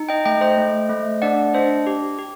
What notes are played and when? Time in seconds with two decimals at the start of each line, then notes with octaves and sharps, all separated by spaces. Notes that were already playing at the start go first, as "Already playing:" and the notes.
Already playing: D#4
0.09 D#5 G5
0.25 A3 D#5 G5
0.41 C5 D#5
0.57 A3
0.89 A3
1.22 D4 D5 F#5
1.54 D4 C5 D#5
1.87 G4
2.18 G4